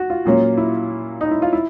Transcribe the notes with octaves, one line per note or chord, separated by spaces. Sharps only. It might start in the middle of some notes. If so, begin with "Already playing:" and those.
Already playing: F#4
F4
A#2 F#3 A#3 C#4
E4
D#4
E4
F4
E4